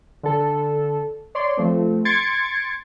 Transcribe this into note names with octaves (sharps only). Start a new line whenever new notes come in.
D3 A4
C#5 D5 C6
F3 A3 C4
C6 G#6 A6 C#7 D7